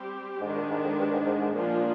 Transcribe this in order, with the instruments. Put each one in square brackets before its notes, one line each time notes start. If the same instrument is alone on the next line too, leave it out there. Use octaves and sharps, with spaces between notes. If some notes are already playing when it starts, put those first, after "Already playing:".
Already playing: [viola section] G3 C4 G4
[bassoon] G#2 [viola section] D#3 G#3 D4
[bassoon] A#2
G#2
F2
G2
G#2
G#2
G#2
[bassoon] A#2 [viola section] F3 A#3 D4 F4 G#4